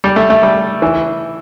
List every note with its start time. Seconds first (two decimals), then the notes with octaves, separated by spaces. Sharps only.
0.04 G3
0.16 A3
0.30 A3
0.43 G3
0.82 E3